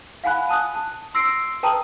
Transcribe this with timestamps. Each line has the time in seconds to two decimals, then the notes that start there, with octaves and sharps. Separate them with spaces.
0.24 F5 F#5 G#5 B5 F#6
0.49 A5 D#6 F#6
0.74 A5
1.14 C6 E6 A#6 C7 D7
1.63 B4 G5 A5 A#5 D#6